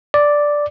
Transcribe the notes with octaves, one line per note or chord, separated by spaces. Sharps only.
D5